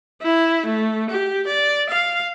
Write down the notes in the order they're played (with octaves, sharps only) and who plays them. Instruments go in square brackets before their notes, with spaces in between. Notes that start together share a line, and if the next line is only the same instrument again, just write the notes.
[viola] E4
A3
G4
D5
F5